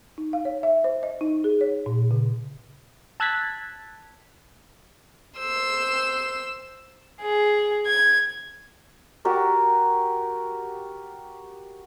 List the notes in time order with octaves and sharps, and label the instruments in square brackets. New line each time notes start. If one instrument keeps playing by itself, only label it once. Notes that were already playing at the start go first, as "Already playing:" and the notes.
[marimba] D#4
F5
C#5
E5
C5
D#5
D#4
G#4
C#5
A#2
C#3
[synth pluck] A5 E6 F#6 G#6 A6 B6
[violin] C5 E6
[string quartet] G#4
G#6
[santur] F#4 G4 A#4 D5